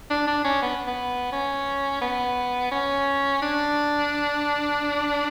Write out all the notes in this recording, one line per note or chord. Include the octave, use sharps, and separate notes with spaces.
D4
D4
C#4
B3
B3
C#4
B3
C#4
D4